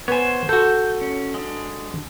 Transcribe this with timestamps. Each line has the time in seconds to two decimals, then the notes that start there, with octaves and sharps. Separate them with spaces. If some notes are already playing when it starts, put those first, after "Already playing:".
0.08 B3 C5 C#5 G#5
0.49 F#4 A4 G6
1.01 C#4
1.34 G#3 D4